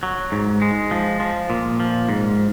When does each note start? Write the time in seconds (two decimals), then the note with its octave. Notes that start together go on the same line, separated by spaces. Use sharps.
0.03 F#3
0.32 G#2
0.62 G#3
0.91 F3
1.20 F3
1.50 A#2
1.80 F3
2.09 G#2